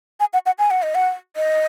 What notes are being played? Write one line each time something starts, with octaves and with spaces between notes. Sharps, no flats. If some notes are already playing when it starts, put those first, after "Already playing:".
G#5
F#5
F#5
G#5
F#5
D#5
F#5
D#5